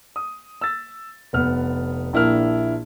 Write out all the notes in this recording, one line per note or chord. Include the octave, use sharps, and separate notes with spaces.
D#6
E6 A6
F1 B3 F6
A#1 D4 E4 A#4 E5 F6